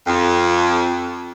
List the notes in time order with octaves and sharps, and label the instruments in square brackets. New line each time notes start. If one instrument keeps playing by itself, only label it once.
[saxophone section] F2